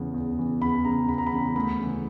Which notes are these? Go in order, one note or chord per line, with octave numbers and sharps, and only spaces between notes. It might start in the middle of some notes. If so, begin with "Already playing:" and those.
Already playing: E2 C#3 E3
E2
C#3 E3
E2 B5
C#3 E3 A#5
E2 B5
A#5
B5
C#3 E3
D2 B5
C#3 E3